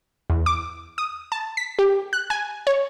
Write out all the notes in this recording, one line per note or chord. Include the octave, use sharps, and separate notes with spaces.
E2
D6
D#6
A5
B6
G4
F#6
G#5
C#5